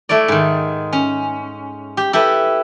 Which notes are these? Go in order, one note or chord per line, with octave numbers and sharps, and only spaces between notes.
A3 E4 C#5 D5
G#2 D#3
C#4
G4
E4 G4 A4 B4